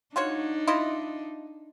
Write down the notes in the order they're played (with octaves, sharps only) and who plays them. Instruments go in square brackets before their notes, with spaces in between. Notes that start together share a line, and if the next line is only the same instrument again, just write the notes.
[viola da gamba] D4 D#4 [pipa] F4 F#4 C#5
[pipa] E4 F4 D#5